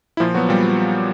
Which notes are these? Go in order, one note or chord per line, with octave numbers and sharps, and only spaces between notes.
E4
A#2 F3 F4
F#3 B3 F#4
A#2 G3 G4